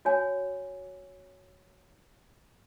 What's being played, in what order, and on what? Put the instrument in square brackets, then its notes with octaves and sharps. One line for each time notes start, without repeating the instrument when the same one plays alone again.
[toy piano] F#4 C#5 G#5